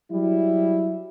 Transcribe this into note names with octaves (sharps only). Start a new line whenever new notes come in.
F#3 G3 E4